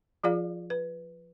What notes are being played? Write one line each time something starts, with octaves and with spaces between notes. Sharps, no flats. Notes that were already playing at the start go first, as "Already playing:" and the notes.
F3 F4 G#4 D5 F5
B4